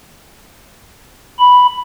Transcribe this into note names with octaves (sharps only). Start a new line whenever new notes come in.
B5